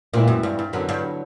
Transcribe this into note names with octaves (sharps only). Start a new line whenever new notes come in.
A#2 E3 G#3 C4 E4
F#2
G2
G2
F#2 D3 F#3 B3 E4
G2